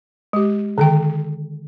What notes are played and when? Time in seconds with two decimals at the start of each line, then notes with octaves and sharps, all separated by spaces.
0.33 G#3 G4
0.78 D3 D#3 G5